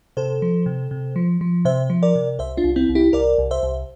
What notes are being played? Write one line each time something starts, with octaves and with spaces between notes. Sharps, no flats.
C3 A4 C5
F3
C3
C3
F3
F3
C3 C5 E5
F3
A#4 D5
C3
C2 C5 E5
D4 F4
C2
C4 E4
C2
E4 G4
C2 A#4 D5
C2
C5 E5
C2